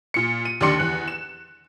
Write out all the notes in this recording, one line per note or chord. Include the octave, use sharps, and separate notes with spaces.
A#2 C#7
D#7
D#2 D3 D#3 D5 C6 C#7
E2 F#6
E7